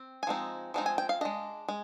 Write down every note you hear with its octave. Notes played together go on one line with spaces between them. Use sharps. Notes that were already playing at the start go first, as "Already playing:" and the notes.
Already playing: C4
G#5
F3 G#3 C4 D#4
F3 G#3 C4 D#4
G#5
G5
F5
G#3 D4 D#5
G#3